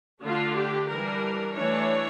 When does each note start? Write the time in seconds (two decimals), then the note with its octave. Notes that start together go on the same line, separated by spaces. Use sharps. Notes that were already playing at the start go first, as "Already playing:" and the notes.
0.23 D3 A3 D4 F4
0.56 G4
0.89 E3 G3 D4 A#4
1.55 E3 A3 D4 C#5